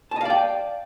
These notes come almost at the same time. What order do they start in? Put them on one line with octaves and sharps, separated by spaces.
A5 D#5 F5 D5 G5